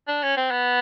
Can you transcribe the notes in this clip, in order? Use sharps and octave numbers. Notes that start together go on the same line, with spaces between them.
D4
C#4
C4
B3